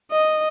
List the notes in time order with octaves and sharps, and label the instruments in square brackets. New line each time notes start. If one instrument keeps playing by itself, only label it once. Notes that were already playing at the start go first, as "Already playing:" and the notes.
[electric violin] D#5